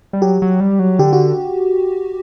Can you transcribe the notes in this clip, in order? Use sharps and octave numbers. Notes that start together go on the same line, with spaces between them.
G3
F#3 G4
F#3
G3
F#3
D3 G4
F#4